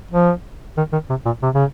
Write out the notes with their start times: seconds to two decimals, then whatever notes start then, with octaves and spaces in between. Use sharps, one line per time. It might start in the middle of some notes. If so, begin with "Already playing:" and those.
0.11 F3
0.77 D#3
0.93 D#3
1.10 C3
1.26 A#2
1.42 C3
1.54 C#3